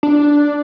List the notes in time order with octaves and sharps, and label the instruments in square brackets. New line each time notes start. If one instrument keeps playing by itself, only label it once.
[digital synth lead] D4